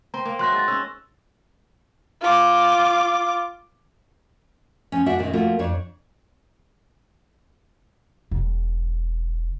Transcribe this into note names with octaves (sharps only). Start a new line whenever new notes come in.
C4 A#5
A#3
F#3 E5 C6 F#6 A#6
G#2 A5 A6
C#4 E6
F4 D6
F3 C#4
C4 D4 F#4 E5 F#5
F#2 A#2 D#3 G#3 C4
F3 A3 A#3 F4 F#4
F2 D4 C#5
E1